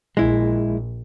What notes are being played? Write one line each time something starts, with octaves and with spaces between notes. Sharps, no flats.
A#1 G#3 E4